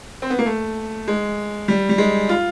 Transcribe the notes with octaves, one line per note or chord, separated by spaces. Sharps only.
C4
B3
A#3
A3
G#3
G3
G3
G#3
F4